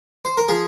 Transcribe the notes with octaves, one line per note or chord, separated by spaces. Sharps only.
C5
A#4
F3 G#4